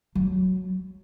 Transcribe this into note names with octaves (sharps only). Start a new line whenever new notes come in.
F#3